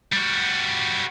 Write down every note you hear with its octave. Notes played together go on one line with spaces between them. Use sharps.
G3 F#4